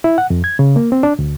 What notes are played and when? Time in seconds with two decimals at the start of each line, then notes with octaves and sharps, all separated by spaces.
0.04 E4
0.18 F#5
0.30 F2
0.44 G#6
0.59 C#3
0.76 A#3
0.92 C4
1.03 D4
1.19 D2